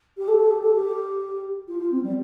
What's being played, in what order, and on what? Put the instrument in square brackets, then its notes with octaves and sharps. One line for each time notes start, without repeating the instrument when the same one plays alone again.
[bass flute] G4
A4
A4
G4
A4
G4
F4
F4
C4
G3